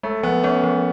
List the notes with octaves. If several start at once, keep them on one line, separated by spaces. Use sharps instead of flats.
G#3 A3
F3 B3
B3 C#4
F3